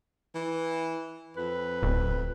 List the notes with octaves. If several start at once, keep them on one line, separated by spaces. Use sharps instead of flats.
E3
F2 B4
D1